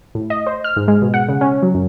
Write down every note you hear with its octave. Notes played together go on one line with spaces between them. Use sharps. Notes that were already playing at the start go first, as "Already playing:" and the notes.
A2
D#5
C5
F6
G#2
G#3
B2
F#5
C#3
C#4
F#3
F#2